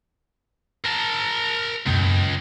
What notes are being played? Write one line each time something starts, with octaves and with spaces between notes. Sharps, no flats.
A#4 A5
C#2 F#2 B2 A#3